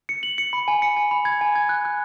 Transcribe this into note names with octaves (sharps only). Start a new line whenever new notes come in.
C#7
F#7
C#7
B5
G#5
C#7
G#5
B5
G#6
G#5
G#6
F#6
F#6